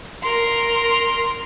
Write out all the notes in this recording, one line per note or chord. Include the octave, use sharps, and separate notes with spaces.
A#4 C6